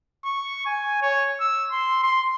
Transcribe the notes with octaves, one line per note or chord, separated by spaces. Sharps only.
C#6
G#5
C#5
E6
C6
C6